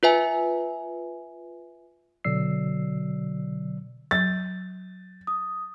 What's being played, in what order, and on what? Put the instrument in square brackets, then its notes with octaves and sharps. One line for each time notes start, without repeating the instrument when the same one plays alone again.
[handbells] F4 B4 E5 G#5
[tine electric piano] B2 D3 F#3 D5 E6 C7
[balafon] F#3 [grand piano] A6
[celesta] D#6